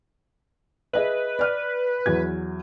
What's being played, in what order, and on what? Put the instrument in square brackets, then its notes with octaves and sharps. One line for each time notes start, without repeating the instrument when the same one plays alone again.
[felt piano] G#4 D#5 E5 [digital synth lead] B4
[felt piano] D5 F6 F#6
E2 F#3 G#6